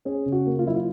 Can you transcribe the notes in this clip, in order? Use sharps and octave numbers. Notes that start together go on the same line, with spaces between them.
C#4 G#4
C#3
F#4
A#3
F4
F#3 E4
F4